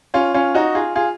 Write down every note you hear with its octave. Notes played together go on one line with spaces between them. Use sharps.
C#4 F4
C#4 F4
D#4 F#4
F4 G#4
F4 G#4